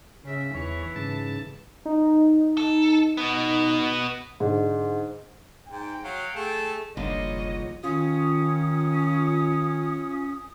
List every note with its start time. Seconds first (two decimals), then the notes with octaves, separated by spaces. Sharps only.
0.24 C#3 E5
0.55 E2 E3 C#5
0.96 G#2 C#3 A5
1.85 D#4
2.57 A4
3.17 B2 B3
4.40 G#2 D3
5.69 G#2 G5
6.04 F#3 F5 F#5
6.35 A3 G#4 A4 A5
6.97 F#1 C2 G#2 D3 F3 A#3 C#5 D#5
7.83 D#3 C#4 F4 D#6